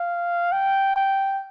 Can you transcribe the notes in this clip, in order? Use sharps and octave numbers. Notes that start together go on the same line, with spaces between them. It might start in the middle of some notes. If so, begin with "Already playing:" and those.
Already playing: F5
G5
G5